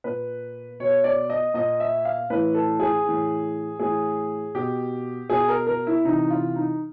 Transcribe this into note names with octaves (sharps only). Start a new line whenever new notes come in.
A#2 B4
B2 C#5
D5
D#5
A#2 D#5
E5
F5
A2 E3 B4
A4
G#4
A2 E3
A2 E3 G#4
B2 G4
B2 G#4
A#4
A#4
E4
C3 E3 D#4
F4
D#4